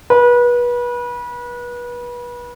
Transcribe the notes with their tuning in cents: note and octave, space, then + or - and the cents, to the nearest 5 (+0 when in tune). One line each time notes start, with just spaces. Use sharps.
B4 -30